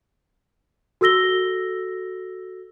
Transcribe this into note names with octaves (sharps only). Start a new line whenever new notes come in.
F#4 A4 E6 A#6 G7